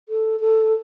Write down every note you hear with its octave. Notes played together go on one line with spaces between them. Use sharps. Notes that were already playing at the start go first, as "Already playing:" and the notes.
A4
A4